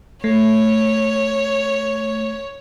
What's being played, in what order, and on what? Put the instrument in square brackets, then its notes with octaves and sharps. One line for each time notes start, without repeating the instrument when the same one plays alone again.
[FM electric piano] A3 [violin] C#5